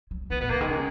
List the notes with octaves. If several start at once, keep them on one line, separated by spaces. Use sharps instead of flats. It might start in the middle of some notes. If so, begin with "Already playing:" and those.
F#3
E3 B3
A#2 B3
C#3 A#3
D#3 G#3
C#3